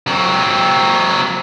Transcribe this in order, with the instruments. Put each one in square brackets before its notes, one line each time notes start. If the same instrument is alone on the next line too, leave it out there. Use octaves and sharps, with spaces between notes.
[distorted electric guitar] F#3 C4